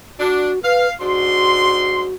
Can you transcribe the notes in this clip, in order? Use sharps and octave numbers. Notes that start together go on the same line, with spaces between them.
D4 F#4
B4 F5
G#2 D4 F#4 C6